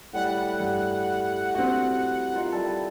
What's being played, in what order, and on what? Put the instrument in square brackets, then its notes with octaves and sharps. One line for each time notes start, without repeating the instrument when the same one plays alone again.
[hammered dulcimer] A2 G3 E4 [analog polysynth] F#5
[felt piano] G2
C4 F#4
[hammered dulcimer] D#4 F4 A#4
G3 E4 A4